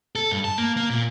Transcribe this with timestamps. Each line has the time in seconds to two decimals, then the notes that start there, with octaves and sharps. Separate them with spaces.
0.15 A4
0.31 G2
0.44 A5
0.58 A#3
0.76 A#3
0.90 A#2